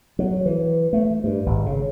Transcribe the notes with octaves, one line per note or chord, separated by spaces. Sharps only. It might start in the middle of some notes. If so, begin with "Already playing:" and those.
F#3
E3
A3
G2
G#1
C#3